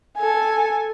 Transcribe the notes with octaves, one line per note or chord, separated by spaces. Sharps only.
A4 G#5